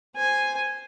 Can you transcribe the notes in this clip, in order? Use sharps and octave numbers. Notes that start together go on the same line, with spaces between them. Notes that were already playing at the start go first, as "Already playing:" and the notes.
C5 G#5